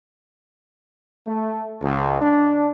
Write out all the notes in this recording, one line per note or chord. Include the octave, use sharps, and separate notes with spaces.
A3
C#2
D4